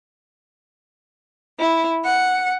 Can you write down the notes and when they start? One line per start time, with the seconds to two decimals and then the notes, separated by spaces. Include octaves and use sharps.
1.59 E4
2.04 F#5